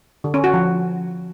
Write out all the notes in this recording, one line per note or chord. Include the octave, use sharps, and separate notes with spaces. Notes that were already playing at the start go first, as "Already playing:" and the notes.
D3
C#4
F#4
F3